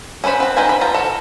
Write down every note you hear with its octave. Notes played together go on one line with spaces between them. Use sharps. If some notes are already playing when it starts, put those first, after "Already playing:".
C#4 G#4 B4 C5 B5
C4 B4
D#3 D#4 B4 C5 G#5
B5
F3 F4 A#5
F#4 A4